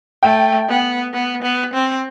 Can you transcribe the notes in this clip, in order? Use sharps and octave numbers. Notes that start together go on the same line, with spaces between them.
A3 G5
B3
B3
B3
C4